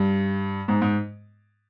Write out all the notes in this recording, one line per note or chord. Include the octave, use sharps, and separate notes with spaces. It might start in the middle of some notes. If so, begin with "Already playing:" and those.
Already playing: G2
G#2
G#2